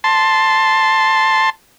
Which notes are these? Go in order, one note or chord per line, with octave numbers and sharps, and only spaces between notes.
A5 C6